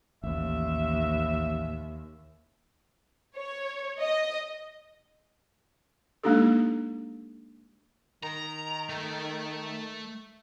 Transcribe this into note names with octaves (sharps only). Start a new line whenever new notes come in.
A1 D#2 E5
C#5
D#5
G#3 A#3 D4 D#4 G4 A4
D#3 A#5
A3